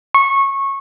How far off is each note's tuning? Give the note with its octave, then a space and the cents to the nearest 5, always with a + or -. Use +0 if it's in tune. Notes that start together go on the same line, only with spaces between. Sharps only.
C#6 -15